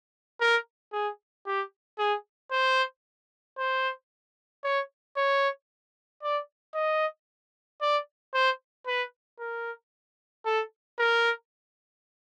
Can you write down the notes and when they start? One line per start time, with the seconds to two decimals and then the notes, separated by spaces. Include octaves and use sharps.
0.41 A#4
0.93 G#4
1.46 G4
1.98 G#4
2.51 C5
3.58 C5
4.64 C#5
5.17 C#5
6.23 D5
6.74 D#5
7.81 D5
8.34 C5
8.87 B4
9.39 A#4
10.45 A4
10.99 A#4